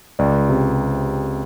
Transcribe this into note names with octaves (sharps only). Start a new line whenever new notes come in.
C#2 D5
C3